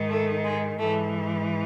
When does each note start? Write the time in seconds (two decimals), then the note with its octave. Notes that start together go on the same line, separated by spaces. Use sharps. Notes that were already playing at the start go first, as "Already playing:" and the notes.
Already playing: G#2 D#3
0.09 A3
0.44 G#3
0.78 G#2 E3 A3